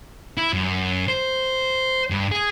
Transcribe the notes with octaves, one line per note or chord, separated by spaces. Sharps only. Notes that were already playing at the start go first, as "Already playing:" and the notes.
E4
F#2
C5
G2
G#4